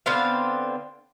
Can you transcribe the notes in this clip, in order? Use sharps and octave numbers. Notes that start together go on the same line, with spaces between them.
D3 B3 C4 F5